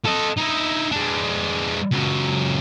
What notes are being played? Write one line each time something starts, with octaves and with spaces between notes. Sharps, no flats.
A4 D#5
D#4 E4
G#3 D4
C#2 F#3